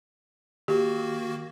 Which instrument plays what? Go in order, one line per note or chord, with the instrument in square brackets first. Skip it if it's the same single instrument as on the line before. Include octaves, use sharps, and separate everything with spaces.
[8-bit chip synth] D#3 A#3 F#4 [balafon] G4